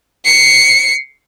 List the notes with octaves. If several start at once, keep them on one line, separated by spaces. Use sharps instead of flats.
C7 C#7